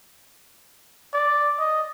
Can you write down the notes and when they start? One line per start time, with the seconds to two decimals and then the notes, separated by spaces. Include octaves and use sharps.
1.13 D5
1.59 D#5